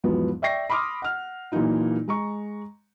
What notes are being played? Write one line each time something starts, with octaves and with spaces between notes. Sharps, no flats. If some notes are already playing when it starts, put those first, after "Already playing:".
E2 G#2 F3 F#3 B3
D5 E5 G5 C#6 A#6 C7
B5 C6 D6 D#6 F6
F#5 F6
A#2 E3 F#3 A#3 D#4 F4
G#3 A#5 C#6